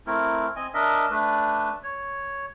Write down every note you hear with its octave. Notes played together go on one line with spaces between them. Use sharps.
A3 C4 E4 A#4
C4 D#5 G#5
D4 A#4 D#5 E5
A3 D4 B4
C#5